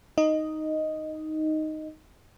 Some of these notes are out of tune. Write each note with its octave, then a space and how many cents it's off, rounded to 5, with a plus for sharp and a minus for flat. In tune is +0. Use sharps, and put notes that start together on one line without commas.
D#4 +0 D#5 +0